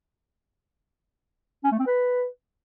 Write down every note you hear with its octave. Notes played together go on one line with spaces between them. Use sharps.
C#4
A3
C4
B4